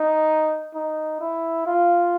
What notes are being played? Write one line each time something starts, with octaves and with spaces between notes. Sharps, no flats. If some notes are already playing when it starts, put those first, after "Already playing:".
Already playing: D#4
D#4
E4
F4